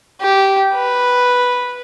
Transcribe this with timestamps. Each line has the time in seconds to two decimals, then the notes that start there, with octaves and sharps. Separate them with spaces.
0.22 G4
0.74 B4